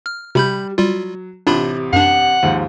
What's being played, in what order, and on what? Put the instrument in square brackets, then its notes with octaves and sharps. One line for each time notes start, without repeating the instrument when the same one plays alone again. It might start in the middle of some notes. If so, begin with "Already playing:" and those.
[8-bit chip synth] F6
[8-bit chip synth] C3 B5 G6 [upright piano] G3
[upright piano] F#3 [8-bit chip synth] G3 F4
[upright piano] A1 C3 [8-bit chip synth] D4 F4 B5
[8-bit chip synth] F#2 D4 [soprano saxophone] F#5
[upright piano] D#2 G#2 F3